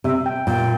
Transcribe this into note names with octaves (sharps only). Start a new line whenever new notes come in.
C3 E5
G5
A#2 G5